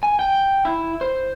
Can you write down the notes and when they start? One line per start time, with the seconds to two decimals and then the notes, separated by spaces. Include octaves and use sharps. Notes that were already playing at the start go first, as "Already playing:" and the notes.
0.03 G#5
0.19 G5
0.65 E4
1.01 C5